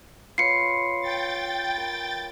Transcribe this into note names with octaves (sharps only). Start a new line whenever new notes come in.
F4 B4 C#5 C7 C#7
G5 A6
A#4